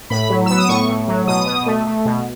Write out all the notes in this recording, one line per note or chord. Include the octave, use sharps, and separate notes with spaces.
A2 B5
F#3
B3 E6
D#6
A2 C#6
A2
F#3
B2 D#6
B2
A3
A3
B2